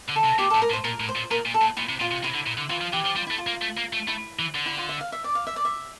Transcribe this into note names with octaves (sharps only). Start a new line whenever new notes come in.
D3
A4
C3
A#2 G4
A2 A4
A#4
A2
C5
A#2 A#4
A2
C5
A#2
A#2 A#4
A#2
A4
A#2
A#2 E4
C3
A#2 F4
C3
C3 E4
D3
A#2
D3
E3 F4
F3
E3 G4
F3
G3 F4
A3 E4
F4
A#3
A3
A#3
A3
A3 E4
E3
D3
E4
F4
E5
F5
E5
D5
F5
E5
D5
E5